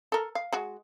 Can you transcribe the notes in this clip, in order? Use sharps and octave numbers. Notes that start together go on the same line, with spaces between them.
A4 A#4
F5
G#3 F#4